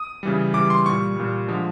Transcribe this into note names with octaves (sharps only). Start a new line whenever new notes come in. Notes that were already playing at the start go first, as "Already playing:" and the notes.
Already playing: D#6
C#3 E3 G3
C#3 E3 G3 D6
C6
A#2 G3 C#6
A#2 G3
D3 F3 G#3